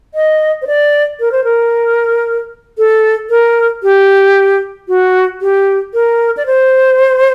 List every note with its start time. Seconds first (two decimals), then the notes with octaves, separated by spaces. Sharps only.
0.14 D#5
0.62 C5
0.67 D5
1.20 A#4
1.32 C5
1.44 A#4
2.78 A4
3.30 A#4
3.83 G4
4.88 F#4
5.41 G4
5.94 A#4
6.37 D5
6.46 C5